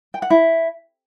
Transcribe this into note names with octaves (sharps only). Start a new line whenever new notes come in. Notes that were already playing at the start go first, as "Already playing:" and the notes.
G5
F#5
E4